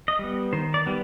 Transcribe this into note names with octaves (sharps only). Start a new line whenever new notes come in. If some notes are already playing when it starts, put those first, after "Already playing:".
D#5
G3 B3
D#3 C5
D5
G3 B3